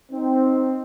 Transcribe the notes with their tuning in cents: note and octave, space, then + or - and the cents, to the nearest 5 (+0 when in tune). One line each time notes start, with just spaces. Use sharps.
C4 +0 D#4 +0